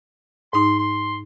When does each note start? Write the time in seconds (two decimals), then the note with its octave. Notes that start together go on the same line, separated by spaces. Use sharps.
0.53 G#2 D#4 C6
0.79 C6